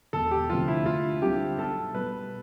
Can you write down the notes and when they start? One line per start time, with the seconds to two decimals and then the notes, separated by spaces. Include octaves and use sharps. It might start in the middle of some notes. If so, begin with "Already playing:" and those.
0.13 E1 A4
0.31 G4
0.49 D2 C3 F3 C4 F4
0.68 E4
0.85 D2 F4
1.22 D3 G3 C4 E4 G4
1.58 B1 A4
1.94 B2 G3 B4